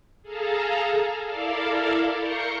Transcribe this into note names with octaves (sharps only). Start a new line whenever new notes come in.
G#4 A4 F5 A5 A#5
E4 A4 A#4 D5 F5 A5
A#4 C#6 G6 A#6 C7 C#7